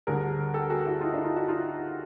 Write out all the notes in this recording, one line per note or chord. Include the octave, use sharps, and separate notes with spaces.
D2 D3 G3 G#4 A#4
G4 A4
F#4 G#4
E4 F#4
D#4 F4
D4 E4
D#4 F4
E4 F#4
D#4 F4